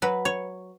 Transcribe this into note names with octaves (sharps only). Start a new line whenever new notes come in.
F#3 B4
C#5